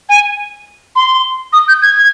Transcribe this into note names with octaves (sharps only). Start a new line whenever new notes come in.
G#5
C6
D#6
G6
G#6